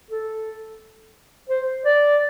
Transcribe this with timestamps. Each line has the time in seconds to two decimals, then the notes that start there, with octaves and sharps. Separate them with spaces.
0.11 A4
1.50 C5
1.85 D5